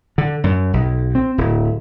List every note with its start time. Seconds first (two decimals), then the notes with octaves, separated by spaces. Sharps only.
0.18 D3
0.44 F#2
0.73 B1
1.15 C4
1.38 D1